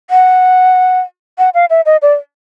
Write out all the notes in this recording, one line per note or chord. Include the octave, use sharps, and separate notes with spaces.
F#5
F#5
F5
E5
D#5
D5